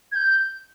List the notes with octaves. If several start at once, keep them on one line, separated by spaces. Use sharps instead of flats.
G#6
G6